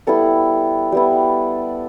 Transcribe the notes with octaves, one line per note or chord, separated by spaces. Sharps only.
G3 B3 E4 A4
G3 B3 E4